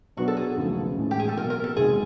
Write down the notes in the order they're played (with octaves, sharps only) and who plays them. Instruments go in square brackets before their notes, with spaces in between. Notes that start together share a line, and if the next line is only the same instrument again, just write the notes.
[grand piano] B2 F#3 B3 D4 [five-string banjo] F#4
[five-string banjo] A4
G#4
[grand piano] D#2 C#3 F3 A3
A2 E3 G#3
[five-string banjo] G4
G#4
A4
[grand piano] B2 F#3 A#3 [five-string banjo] A#4
[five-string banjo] A#4
A4
[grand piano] E2 C3 D#3 G#3 [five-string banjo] G#4